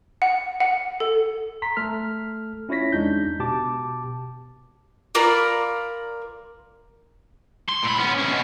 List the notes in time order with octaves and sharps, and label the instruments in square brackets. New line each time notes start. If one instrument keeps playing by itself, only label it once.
[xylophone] F#5
F#5
A4
[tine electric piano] A#5 C6 B6
A3 A4 F6
C#4 E4 F4 C#5 A#6 B6
E2 G#3 D4 D#4 G6
B2 G4 A5 D6
[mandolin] F4 A#4 D5 B5
[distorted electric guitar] C6
A2 B5
B3 C#4
C3 C#4
B2